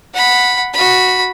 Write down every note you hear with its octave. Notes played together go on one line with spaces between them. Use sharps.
F#5 B5
F#4 B5